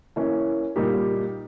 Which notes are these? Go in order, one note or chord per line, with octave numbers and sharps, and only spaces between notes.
E3 A#3 C#4
A#2 G3 A#3 D#4 G4